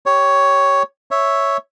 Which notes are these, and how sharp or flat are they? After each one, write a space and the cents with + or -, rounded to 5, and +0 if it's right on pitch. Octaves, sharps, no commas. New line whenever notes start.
G4 +0 C#5 +5
C#5 +0 E5 +0